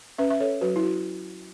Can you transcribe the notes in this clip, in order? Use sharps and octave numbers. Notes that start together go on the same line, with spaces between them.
C#4 B4 E5
E5
A4 C#5
F#3 F#4 B4
E4
F#4